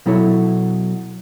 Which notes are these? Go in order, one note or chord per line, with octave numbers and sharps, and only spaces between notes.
B2 F#3 E4 A4 C#5